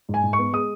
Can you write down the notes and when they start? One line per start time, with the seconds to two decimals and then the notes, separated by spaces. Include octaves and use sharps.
0.09 G#2
0.14 G#5
0.23 G#2
0.33 C#6
0.39 B3
0.53 G#3 D#6